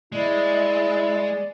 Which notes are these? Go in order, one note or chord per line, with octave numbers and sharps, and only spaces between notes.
G#3 E4 D5